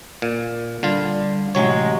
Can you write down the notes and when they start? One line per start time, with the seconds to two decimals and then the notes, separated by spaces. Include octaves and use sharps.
0.22 A#2
0.83 D3 G3 F4
1.55 A1 C3 F#3 G#3 C#5